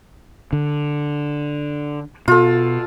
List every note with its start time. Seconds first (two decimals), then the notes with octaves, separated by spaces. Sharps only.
0.53 D3
2.28 B2 F4 A4